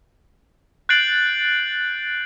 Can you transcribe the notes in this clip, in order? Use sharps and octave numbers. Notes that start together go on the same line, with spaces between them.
F#6 G6 A6 C7 D7 F#7